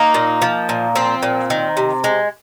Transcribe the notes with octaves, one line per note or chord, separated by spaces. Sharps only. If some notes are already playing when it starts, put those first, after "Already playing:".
Already playing: A#3 D#4
A#2
F3
A#2
F3 C4
A#2
D#3
C3
G#3